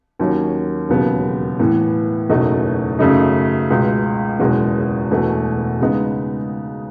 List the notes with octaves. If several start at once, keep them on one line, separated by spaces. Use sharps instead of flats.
D#2 D#3 F#3 C#4
E1 D#2 C#3 F#3 B3
A2 E3 B3
F#1 E2 B2 A3 D#4
F#2 C#3 F#3 A3 D#4
C#2 B2 G#3
F#1 E2 B2 G#3
E1 E2 B2 A3
C#3 G#3 B3 D#4